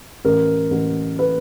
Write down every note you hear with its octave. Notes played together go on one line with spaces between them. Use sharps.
A1 A#4
A1
B4